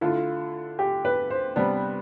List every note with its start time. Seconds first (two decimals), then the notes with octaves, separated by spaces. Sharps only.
0.01 D3 A3 E4 F4
0.79 G4
1.05 B4
1.30 C5
1.56 C3 G3 B3 D4